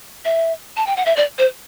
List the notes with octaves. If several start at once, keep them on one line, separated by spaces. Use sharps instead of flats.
E5
A5
G5
F#5
E5
D5
C5